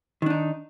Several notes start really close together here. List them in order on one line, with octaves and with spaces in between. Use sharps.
D#3 D4 D#4